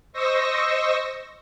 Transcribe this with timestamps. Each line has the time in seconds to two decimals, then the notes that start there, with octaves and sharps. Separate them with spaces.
0.13 C5 D#5 C#6 E6 A#6